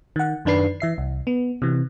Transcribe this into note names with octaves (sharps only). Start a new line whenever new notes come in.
D#3 F#5
F#2 D#3 D4 B4 C7
E3 E5 C7
C2
B3
C3 E3